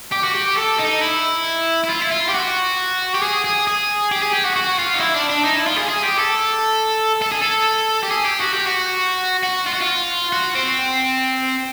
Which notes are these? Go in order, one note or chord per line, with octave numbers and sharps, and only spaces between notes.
G4
F#4
G4
A4
D#4
E4
E4
F4
E4
F4
G4
F#4
G4
G#4
G#4
G#4
G4
G#4
G4
F#4
F#4
F4
D#4
E4
D4
D4
D#4
E4
F4
G#4
G#4
G4
A4
A4
G#4
A4
G4
G#4
G4
F#4
G4
F#4
F#4
F4
F#4
F4
F#4
C4